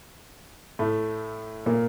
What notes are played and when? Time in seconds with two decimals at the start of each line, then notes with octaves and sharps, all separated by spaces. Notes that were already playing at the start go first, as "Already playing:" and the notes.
0.79 A2 A3
1.66 A#2 A#3